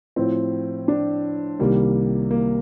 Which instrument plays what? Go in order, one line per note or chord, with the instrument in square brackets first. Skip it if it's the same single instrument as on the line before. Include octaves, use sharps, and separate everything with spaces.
[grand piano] A2 F3 C4
D4
C2 C3 D#3 G3 A#3
A#3